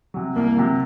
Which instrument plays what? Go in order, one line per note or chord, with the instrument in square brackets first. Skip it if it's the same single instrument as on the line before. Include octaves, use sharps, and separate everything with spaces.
[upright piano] C3 F#3
[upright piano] C2 [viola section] A#3
[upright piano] C3 F#3